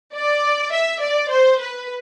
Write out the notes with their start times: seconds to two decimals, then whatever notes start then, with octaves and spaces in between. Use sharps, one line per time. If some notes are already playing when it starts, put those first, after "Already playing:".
0.13 D5
0.71 E5
1.00 D5
1.29 C5
1.58 B4